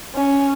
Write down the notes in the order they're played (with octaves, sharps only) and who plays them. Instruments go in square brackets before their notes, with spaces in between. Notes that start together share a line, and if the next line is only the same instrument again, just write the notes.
[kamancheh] C#4